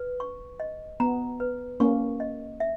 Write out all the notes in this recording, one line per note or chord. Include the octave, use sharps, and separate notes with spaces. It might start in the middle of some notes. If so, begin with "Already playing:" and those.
Already playing: B4
C#6
D#5
B3 A#5
B4
A#3 C#4 C#6
D#5
E5